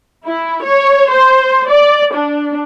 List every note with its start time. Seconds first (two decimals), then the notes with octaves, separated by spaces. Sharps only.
0.25 E4
0.63 C#5
1.09 C5
1.69 D5
2.13 D4